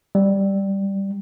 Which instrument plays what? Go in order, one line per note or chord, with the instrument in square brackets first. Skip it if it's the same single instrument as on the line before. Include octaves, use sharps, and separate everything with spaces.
[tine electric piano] G3